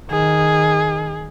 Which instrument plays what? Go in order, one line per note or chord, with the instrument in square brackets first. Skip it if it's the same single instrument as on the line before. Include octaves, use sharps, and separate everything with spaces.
[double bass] D#3 [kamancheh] G#4